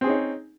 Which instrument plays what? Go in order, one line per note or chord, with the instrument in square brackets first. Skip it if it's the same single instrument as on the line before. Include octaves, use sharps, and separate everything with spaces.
[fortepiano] C4
G#4
C#4
D#4